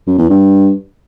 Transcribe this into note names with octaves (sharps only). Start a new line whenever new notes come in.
F#2
E2
G2